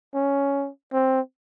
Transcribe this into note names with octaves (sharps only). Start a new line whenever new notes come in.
C#4
C4